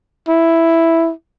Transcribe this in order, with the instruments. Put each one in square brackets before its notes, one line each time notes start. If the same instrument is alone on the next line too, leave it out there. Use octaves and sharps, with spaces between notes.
[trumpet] E4